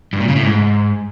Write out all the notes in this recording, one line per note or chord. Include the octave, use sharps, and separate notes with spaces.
G2
A#2
C#3
A2
G#2